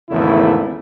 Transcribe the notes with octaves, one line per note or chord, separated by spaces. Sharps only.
G#1 E2 C#3 A3 E4